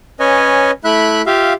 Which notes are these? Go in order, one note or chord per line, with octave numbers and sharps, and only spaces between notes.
C#4 B4 C#5 D#5 G#5
A3 E4 E5 B5 F#6
F4 G4 E5 F5